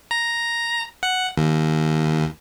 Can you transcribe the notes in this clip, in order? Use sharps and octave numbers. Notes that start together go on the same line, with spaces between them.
A#5
F#5
D#2